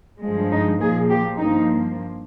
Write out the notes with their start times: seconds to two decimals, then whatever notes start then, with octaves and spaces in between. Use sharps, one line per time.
0.21 G2 F3 G#3
0.52 D#4
0.80 A#2 F3 A#3 G#4
1.10 G4
1.38 G2 F3 A#3 D#4